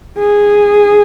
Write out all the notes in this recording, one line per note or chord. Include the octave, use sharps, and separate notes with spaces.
G#4